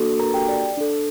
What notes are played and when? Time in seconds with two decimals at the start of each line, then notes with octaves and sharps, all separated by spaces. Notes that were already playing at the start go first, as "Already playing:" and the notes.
Already playing: A#3 D4 F#4 A4
0.19 A#4 A#5
0.34 G4 G5
0.49 D5
0.77 D4 A4